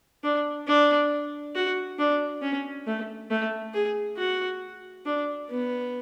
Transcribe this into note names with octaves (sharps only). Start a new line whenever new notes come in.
D4
D4
F#4
D4
C#4
A3
A3
G#4
F#4
D4
B3